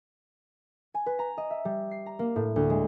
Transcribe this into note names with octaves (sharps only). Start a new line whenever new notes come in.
G#5
B4
A#5
D#5
E5
G3
C7
A#5
A#3
A2
D2
G#3